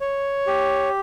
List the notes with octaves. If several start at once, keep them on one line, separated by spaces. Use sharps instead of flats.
C#5
G4